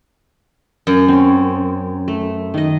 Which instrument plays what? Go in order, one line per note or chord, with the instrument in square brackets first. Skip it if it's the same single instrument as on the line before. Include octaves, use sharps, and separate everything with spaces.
[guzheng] F#2
[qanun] C4 C#4
A3
D#3 D#5